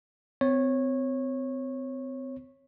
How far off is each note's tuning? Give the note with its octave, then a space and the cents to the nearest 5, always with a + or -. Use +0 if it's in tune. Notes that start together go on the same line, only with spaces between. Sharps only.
C4 -35 C#5 -15